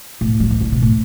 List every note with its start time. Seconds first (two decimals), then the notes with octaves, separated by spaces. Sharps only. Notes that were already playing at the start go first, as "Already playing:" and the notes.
0.21 A2
0.40 F#3
0.51 E3
0.61 D3
0.72 B2
0.82 A2